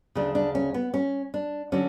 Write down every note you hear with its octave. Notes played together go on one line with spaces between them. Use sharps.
D2 C#3 F#3 D4
D4
C#4
B3
C#4
D4
D3 F#3 C#4